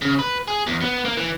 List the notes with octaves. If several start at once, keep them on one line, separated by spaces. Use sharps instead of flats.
C#3
B4
G#4
E2
B3
A#3
E3